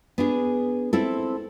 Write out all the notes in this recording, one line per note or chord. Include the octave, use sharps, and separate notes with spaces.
B3 D4 G#4
C4 E4 A4